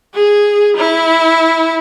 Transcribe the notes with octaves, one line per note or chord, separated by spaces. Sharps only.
G#4
E4